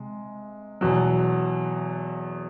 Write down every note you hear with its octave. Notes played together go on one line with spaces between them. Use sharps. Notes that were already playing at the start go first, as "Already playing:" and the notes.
Already playing: C3 G#3
E2 B2 F#3